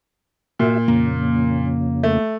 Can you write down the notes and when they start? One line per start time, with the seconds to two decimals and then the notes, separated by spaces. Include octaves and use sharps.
0.59 A#2 F#4 E5
0.88 F2 C#3 A#3
2.03 A3